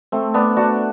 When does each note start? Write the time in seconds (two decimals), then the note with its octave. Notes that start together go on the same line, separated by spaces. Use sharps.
0.12 A3 C4
0.34 B3 D4
0.57 D4 F#4